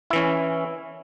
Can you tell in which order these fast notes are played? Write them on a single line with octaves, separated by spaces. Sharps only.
E4 E3 C#4